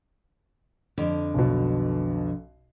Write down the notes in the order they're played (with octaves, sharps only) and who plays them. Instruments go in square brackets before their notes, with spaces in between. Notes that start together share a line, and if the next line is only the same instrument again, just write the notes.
[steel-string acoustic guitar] F2 D3
[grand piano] B1 B2